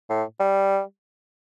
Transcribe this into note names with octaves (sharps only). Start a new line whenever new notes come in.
A2
G3